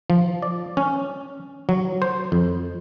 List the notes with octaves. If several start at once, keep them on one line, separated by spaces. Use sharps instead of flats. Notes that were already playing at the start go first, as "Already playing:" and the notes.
F3
D5
C#4
F#3
C5
F2